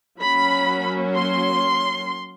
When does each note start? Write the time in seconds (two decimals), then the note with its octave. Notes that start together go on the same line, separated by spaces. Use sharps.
0.19 F#3 A#3 C#4 B5
1.15 C6